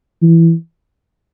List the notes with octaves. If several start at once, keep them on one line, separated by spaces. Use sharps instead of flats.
E3